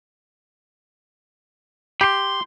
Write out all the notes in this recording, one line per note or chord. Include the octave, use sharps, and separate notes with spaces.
G4 B5 C6